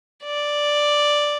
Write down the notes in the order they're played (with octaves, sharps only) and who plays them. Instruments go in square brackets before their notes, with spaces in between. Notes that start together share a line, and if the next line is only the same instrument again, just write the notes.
[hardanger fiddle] D5